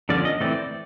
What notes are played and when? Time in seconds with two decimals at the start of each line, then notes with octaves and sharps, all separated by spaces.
0.09 D3 F3 A#3 C#4 D5
0.25 D#5
0.40 E3 A3 C4 D5